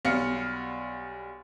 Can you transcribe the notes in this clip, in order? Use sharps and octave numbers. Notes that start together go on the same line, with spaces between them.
B1 G3 B3 F5 F6 C#7